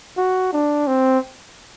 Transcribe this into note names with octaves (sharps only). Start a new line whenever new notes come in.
F#4
D4
C4